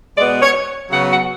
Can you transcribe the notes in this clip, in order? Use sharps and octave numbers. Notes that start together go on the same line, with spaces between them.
B2 G#3 B3 D5
C#5
C#3 F#3 B3 F#5
F#5